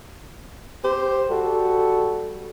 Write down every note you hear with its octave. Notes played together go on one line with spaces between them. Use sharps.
G4 C5
G3 F#4 A4